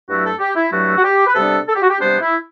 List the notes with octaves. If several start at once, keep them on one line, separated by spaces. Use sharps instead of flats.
G2 F#3 A3 E4 F#4
A4
G4
E4
G2 F#3 A3 E4 F#4
F#4
G4
B4
C3 G3 B3 D4 A4
A4
G4
F#4
G4
C3 G3 B3 D4 C5
E4